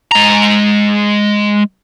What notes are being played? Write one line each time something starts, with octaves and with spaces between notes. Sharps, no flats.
G#3 A#5